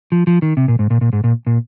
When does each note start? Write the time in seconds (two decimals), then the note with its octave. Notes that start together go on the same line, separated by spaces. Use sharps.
0.12 F3
0.27 F3
0.42 D#3
0.57 C3
0.68 A#2
0.79 G#2
0.90 A#2
1.01 A#2
1.13 G#2
1.24 A#2
1.47 A#2